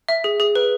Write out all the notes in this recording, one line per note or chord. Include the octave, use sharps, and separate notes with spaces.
E5
G#4
G#4
B4